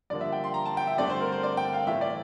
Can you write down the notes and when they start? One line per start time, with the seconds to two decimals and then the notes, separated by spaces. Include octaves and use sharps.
0.10 G2 D3 F3 A#3 D5
0.21 E5
0.32 G5
0.44 C6
0.54 A#5
0.65 A5
0.77 G5
0.87 E5
0.98 G2 D3 A3 C4 D5
1.10 C5
1.20 A#4
1.32 C5
1.43 D5
1.57 G5
1.73 F5
1.87 A2 E3 A3 E5
2.01 D5